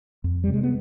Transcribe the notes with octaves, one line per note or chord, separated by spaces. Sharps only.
F2
G3
C3
G#3
B3